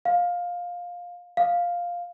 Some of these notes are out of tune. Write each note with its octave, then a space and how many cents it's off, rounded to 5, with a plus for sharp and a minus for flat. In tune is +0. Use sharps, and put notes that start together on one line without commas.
F5 +15
F5 +5